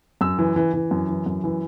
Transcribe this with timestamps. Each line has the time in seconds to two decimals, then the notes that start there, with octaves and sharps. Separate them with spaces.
0.21 F#2 E6
0.39 E3
0.56 E3
0.74 E3
0.91 F#2
1.09 E3
1.26 F#2
1.44 E3